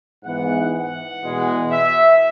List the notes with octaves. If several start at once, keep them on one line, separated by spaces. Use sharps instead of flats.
G#2 E3 B3 E4 F#5
F#5
E2 B2 G#3
E5